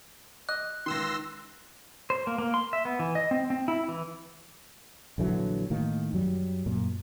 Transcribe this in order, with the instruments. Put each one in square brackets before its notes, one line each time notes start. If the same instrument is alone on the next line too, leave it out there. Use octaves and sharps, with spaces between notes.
[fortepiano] D#5 [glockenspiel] F#6
[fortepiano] C#2 D#3 [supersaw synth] C6 E6 A#6
[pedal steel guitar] C5
A#3
A#3
C6
E5
B3
E3
D#5
C4
C4
E4
E3
[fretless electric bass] A#1 D3 E3 F#3
A2 D#3 A#3
F#2 F#3 G3
F#2 A#2